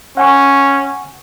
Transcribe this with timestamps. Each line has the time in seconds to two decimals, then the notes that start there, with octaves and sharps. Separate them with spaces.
0.17 C#4 F#5 G#5 C#6